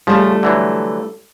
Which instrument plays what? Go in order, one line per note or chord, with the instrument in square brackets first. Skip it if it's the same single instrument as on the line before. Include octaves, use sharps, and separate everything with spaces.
[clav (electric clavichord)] C#3 F3 [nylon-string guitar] G3 A3
[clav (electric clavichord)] D3 E3 F#3